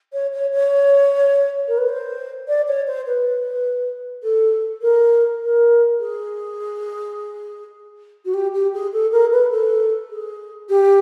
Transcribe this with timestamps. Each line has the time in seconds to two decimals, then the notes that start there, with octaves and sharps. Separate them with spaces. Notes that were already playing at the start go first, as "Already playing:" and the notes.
0.13 C#5
0.33 C#5
0.52 C#5
1.68 A#4
1.78 B4
1.89 C5
2.48 D5
2.68 C#5
2.87 C5
3.07 B4
4.23 A4
4.82 A#4
5.41 A#4
6.00 G#4
8.25 F#4
8.34 G4
8.54 G4
8.74 G#4
8.93 A4
9.12 A#4
9.32 B4
9.51 A4
10.11 G#4
10.69 G4